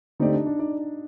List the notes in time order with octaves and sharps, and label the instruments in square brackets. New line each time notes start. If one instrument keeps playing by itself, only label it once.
[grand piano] D3 A3 C4 G4 D5 [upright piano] D#4
[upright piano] D4
D4
[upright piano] D#4 [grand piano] D5